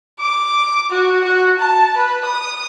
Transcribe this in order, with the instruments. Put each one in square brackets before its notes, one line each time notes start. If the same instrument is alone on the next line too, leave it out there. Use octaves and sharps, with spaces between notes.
[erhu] D6
F#4
F#4
A5
B4
D#6